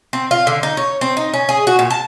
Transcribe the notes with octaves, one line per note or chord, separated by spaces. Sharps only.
C4
F4
D3
D#4
C#5
C4
D#4
C#4
G#4
F#4
A#2
A5